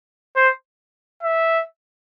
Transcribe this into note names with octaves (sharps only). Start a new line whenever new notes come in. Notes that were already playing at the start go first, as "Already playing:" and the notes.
C5
E5